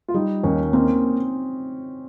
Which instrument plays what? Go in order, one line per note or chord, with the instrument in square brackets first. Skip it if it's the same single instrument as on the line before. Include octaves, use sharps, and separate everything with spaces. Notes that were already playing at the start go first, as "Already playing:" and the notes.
[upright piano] F4
[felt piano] G3 [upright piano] D#4
[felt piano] D#2 [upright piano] C#4
[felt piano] A#3 [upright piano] C4